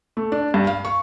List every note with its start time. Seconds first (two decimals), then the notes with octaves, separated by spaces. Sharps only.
0.17 A3
0.32 D4
0.54 G2
0.67 F5
0.85 C#6